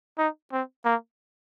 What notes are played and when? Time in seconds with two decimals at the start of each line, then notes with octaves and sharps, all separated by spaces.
0.18 D#4
0.52 C4
0.85 A#3